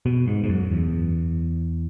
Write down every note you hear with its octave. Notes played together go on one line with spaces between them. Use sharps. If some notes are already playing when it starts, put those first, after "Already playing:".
B2
G#2
G#2
F#2
E2